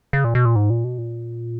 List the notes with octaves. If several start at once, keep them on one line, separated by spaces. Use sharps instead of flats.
C#3
A#2
B2
A#2
G#2
A#2
B2
A#2